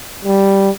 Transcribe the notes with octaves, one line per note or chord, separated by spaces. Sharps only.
G3